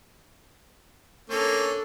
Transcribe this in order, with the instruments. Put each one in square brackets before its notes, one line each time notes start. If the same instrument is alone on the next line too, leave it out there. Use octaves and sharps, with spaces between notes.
[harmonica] A#3 C#4 [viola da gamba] D4 A4